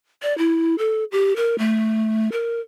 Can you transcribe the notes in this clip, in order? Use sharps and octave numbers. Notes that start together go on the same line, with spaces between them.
D5
E4
A4
G4
A#4
A3
A#4